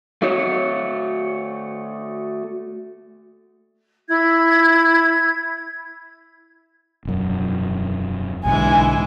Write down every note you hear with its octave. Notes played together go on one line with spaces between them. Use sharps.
A3 F#4 C#5
E4 G#6
E1 F#2
B1 G#2 D3 E3 G#3 G#5